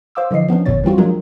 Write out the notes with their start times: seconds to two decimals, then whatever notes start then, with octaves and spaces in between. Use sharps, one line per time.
0.15 C5 F5 D6 E6
0.31 D3 E3 F3 D#5 C7
0.48 F3 B3 C#4 D4
0.66 G1 F2 A#2 D3 C#5 A6
0.84 E3 G3 C4 F4 F#4
0.98 F3 F#3 G#3 D4 F4 A#4